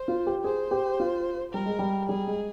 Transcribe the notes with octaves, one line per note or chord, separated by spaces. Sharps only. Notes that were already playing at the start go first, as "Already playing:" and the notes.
Already playing: C5
F4
G4
G#4 C5
G4
F4
G3 A#4
G#3
G3
G3 G#4
G#3